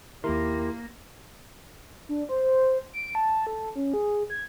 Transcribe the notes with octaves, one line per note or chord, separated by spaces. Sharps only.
D#2 D#3 A#3 E4 G4 A#4 C6
D4
C5
D7
A5
A4
C#4
G#4
G#6